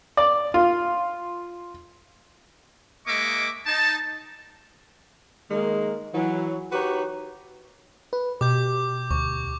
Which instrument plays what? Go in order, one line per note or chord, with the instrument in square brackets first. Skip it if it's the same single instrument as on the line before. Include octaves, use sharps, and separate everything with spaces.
[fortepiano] D5
F4
[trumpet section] G#3 A#3 D#5 E5 C#6 D6
D#4 A5
[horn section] D#3 G#3 A#3
E3 F#3
D#4 F#4 G4 A#4 B4 C#5
[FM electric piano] B4
[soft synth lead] B2 [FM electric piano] G4 [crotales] D6 G6
[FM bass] D2 [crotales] C#6